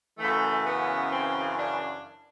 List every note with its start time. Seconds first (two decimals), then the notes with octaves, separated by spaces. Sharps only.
0.18 F#2 C#3 E3 A3
0.64 B3
1.10 C4
1.56 D4